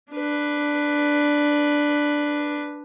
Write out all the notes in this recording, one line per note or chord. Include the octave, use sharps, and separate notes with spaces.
D4 B4